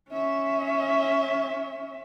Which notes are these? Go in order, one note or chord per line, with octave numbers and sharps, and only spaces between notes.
C#4 E5